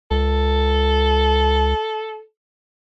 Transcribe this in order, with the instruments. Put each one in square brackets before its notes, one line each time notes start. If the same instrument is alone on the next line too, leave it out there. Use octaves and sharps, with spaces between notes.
[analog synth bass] C#2 [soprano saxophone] A4